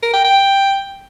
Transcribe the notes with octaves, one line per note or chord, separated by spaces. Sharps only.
A#4
G5
G5